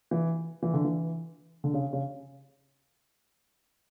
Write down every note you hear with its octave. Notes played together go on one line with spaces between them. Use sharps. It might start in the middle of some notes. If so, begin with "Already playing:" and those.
E3
E3
D3
E3
D3
C#3
C#3